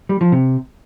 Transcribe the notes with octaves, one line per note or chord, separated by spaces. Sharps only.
G3
F3
C3